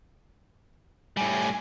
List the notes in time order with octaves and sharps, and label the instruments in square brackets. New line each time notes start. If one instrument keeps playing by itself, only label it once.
[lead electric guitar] A2 G3 [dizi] G#5